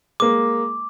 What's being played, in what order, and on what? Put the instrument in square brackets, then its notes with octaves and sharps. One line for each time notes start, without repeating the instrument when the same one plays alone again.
[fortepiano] G#3 A#3 [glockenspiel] D6